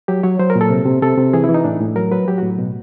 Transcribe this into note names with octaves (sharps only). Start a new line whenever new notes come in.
F#3 G4
F#3 C#5
F#3 C5
A#4
A#2
A4
C3
C3
C3 A4
C3
E3 G#4
E3 E4
D#4
A2 D4
A2
F#3 A#4
F#3 B4
F#3 G4
A2 F#4
B2